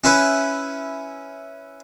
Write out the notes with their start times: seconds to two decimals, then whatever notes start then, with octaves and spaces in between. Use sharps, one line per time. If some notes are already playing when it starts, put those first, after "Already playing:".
0.04 C#4 E4 B4